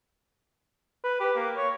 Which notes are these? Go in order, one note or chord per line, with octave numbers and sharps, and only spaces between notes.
B4
G4
A#3
C#5